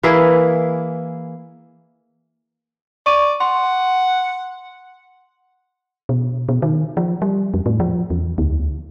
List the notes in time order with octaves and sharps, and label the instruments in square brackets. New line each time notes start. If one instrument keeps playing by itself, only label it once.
[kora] E3 A#3 E4 G#4
[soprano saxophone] D5 [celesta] C#6 D#7
[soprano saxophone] F#5 [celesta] C6
[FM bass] B2
B2
D#3
F3
G3
F2
A2
F3
E2
D2